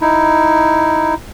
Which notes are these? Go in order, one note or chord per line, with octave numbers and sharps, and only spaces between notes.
D#4 E4